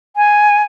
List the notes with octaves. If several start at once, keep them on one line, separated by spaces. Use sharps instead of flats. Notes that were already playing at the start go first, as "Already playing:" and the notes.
G#5